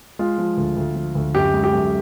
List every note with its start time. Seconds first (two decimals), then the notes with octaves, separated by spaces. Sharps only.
0.19 G#3 F4
0.38 F3
0.57 D2
0.77 D2
0.96 F3
1.15 D2
1.35 F#2 G4
1.54 G#3
1.64 G4
1.73 F#2